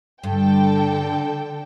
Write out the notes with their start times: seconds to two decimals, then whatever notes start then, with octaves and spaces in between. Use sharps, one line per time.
0.23 G2 D3 A4 G5